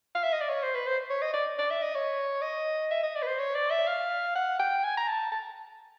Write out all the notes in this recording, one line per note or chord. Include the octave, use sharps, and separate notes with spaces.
F5
E5
D#5
D5
C#5
C5
B4
C5
C#5
D#5
D5
D5
E5
D#5
C#5
D#5
E5
D#5
D5
B4
C5
C#5
D5
E5
F5
F#5
G5
G#5
A#5
A5
A5